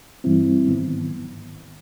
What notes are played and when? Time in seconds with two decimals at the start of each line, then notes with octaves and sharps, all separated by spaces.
0.24 G2 E3 G3 C4 E4
0.68 G#2 D#3 F#3 B3